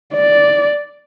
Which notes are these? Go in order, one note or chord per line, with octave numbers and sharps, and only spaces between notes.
D5